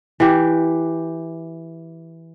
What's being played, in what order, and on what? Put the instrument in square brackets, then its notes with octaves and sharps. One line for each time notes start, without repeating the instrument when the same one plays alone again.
[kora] E3 G4